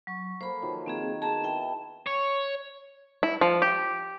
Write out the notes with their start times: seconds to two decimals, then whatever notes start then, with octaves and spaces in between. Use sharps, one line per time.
0.07 F#3 C#6
0.41 A#3 A4 C5 B5
0.62 D#3 F3 F#3
0.86 D#3 A#3 C4 G#4
1.22 B3 G#4 A5 A#5
1.44 E4 E5 G5
2.07 C#5
3.23 E4
3.41 F3
3.62 G4